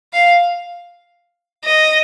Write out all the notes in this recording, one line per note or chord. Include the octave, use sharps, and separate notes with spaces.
F5
D#5